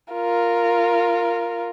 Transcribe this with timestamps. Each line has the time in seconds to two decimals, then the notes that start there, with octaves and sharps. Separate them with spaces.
0.13 F4 A#4